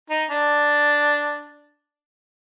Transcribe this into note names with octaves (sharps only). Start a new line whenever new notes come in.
D#4
D4